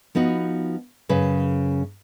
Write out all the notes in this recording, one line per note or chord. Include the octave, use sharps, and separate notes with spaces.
F3 B3 D#4 F#4
F#2 C#3 B4